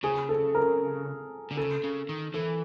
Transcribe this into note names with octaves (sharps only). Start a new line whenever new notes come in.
C#3 G#4
A4
A#4
D3
C#3 A4
C#3
D#3
E3 A4